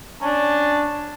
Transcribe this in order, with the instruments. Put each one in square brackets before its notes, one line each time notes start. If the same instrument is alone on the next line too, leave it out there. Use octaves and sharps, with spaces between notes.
[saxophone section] C#4 D4 [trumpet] A5